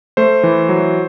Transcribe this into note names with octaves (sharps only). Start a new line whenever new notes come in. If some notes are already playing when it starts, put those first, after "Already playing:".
A3 C5
E3
F#3